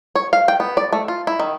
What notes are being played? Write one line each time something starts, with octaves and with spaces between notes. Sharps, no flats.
C#5
F5
G5
B3
D5
A3
F4
E4
D#3